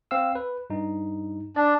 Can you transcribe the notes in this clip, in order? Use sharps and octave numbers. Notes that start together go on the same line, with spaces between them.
C4 F5 E6
B4
G2 D#4
D4 D5